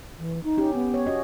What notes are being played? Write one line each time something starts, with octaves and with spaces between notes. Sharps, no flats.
E3
D#4
C#4 G4
B3
C#5
C#4 F#4 D#5